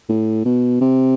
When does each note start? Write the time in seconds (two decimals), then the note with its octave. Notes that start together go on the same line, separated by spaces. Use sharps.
0.09 A2
0.45 B2
0.81 C3